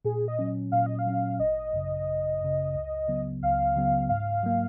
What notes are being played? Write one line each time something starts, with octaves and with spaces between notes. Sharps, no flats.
A#2 G#4
D#5
F#3 C#4
A#2 F5
D#5
F5
F#3 C#4
G#1 D#5
F#2 C#3
G#1
F#2 C#3
C#2
C#3 F#3 B3
C#2 F5
C#3 F#3 B3
G#2 F5
F#3 A#3